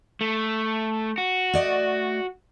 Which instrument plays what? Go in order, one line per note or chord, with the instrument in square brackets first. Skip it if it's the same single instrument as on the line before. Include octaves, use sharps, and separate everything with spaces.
[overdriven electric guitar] A3
F#4
[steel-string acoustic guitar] A3 D5 D#5